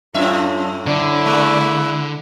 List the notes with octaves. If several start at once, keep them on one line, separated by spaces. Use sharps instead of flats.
F#2 A2 C#4 F4 E5
D3 E4 D5
G#3 A#3